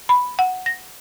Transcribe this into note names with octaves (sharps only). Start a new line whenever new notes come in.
B5
F#5
A#6